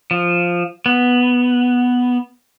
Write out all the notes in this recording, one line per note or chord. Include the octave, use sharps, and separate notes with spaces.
F3
B3